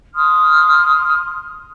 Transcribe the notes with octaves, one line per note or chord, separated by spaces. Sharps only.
C6 D#6 F6